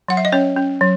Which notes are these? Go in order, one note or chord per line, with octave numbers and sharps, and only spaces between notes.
F#3 F#5
E5
D#5
C#4 C#5
C#4
F#3